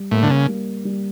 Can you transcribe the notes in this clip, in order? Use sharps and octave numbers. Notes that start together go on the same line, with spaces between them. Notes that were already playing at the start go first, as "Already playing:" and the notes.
Already playing: G3
A2 A#3
D3
C#3
G3
G3